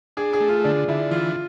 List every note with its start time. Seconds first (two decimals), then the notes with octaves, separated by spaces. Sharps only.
0.17 D4 G#4
0.33 G#4
0.40 A3
0.49 F4
0.64 D3 D4
0.88 D3 E4
1.11 E3 F4